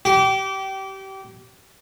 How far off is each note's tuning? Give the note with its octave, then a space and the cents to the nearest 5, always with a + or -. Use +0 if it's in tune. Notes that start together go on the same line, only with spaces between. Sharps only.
G4 -25